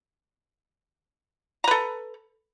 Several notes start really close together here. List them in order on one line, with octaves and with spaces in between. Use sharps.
A#5 B4 A4